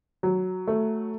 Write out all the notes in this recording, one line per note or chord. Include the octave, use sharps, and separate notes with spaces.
F#3
A3